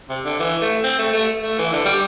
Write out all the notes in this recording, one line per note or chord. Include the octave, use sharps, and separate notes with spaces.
C3
D3
E3
A3
C4
A3
A3
A3
E3
D3
G3